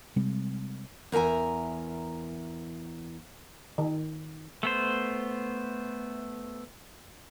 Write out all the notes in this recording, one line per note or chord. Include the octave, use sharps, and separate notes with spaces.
C3 G3 G#3 C4
E2 A#4 E5 G#5 A#5
D#3
A3 B3 C5